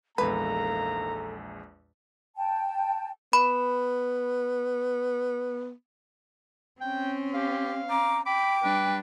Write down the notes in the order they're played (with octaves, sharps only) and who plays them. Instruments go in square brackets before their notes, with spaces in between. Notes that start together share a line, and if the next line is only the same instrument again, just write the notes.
[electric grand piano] A#1 E2 G#3 [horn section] G#2 A#3 A#5 [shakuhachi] A4 [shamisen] B4
[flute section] G5 A5
[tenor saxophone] B3 [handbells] B5
[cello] C4 C#4 [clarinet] G5
[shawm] G4 [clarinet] F5
[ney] A#5 [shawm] D6
[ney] G5 [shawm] B5 [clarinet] D6
[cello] G3 D4 [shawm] B4